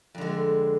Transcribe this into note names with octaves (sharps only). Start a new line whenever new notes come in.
F2 D3 G#3